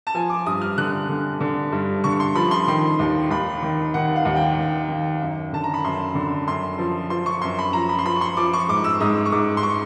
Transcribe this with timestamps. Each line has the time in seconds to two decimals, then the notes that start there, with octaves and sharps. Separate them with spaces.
0.07 A5
0.14 F3 G#5
0.30 D6
0.46 G2 D#6
0.62 F6
0.78 D3 F#6
1.09 D3
1.41 D3
1.72 G2
2.04 D3 C#6
2.20 C6
2.35 F3 B5
2.51 C6
2.68 D#3 C6
2.99 D#2
3.30 D#2 B5
3.62 D#3
3.94 D#3 F#5
4.16 F5
4.25 D#2
4.36 G5
4.57 D#3
4.88 D#3
5.21 F#2
5.53 D3 A5
5.64 A#5
5.74 B5
5.84 F#2 C6
6.15 D3
6.47 F#2 C6
6.78 F3
7.10 F3 C6
7.26 C#6
7.42 F#2 C6
7.59 B5
7.73 F3 A#5
7.89 B5
7.99 C6
8.06 F3 B5
8.16 C#6
8.21 C6
8.37 F3 D6
8.53 C#6
8.69 G#2 D6
8.84 E6
9.00 G#2 D#6
9.26 C#6
9.32 G#2 D6
9.57 C6
9.63 C#6